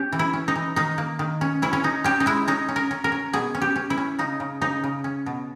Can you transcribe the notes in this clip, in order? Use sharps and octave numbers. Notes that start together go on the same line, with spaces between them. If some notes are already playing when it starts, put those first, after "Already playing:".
Already playing: C#4 G4
E3
E4
C#4
D#4
E3
D#3 D#4
A#3
D#3
C#4
C#4 E4
C#4
C#4 D#4
C#4 G4
D#4
G#3 E4
C#4 D#4
C#4
A#4
C#4
A#4
C#4
B2 G#4
C#4
G4
C#4
E4
C#4
C#3 D#4
C#3
C#3 D#4
C#3
C#4
B2